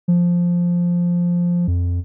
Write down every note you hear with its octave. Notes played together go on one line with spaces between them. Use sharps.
F3
F2